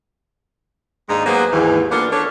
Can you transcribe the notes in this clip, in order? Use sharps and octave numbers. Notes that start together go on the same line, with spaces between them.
D#2 G#2 G#3 D4 D#4
F#3 A#3 B3 G#4 B4 C5
D#2 G#2 E3
A#3 B3 D4 F4 A4 A#4
A3 D4 C#5